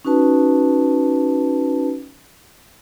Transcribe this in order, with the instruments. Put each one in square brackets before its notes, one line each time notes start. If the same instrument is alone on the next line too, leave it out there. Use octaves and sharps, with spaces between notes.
[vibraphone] C#4 D#4 F#4 B4 A5